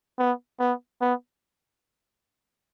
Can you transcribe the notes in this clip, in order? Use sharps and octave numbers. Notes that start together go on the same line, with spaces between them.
B3
B3
B3